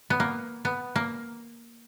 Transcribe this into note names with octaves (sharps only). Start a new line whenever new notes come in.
B3
A#3
B3
A#3